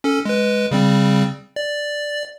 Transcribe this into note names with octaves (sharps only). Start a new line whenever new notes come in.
C#4 A4
G#3 B4
C#3 G3 C4
D5